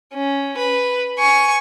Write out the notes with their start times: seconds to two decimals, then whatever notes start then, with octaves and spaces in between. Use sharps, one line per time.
0.13 C#4
0.58 B4
1.19 G#5 C#6